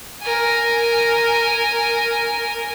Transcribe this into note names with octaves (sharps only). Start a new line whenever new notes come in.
A#4 G#5